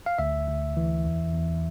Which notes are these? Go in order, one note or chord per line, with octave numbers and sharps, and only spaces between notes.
F5
D2 E5
D2
E3
E2
E2